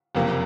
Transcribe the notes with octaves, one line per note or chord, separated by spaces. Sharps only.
F#1 F2 C3 F3 A#3